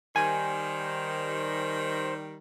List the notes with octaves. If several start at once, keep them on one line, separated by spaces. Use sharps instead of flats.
D#3 G3 C5 G#5